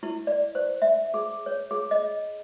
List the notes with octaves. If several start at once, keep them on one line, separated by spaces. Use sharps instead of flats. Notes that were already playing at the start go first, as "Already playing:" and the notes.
E4
D5
C5
E5
G#4
C#5
G#4
D#5